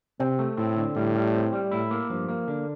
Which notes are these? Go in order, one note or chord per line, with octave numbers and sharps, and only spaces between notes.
C3 C4
A3
A2 C4
D3
A2 G3
G3
C4
G3
A2 E4
A#3
G2 F3
A#3
D3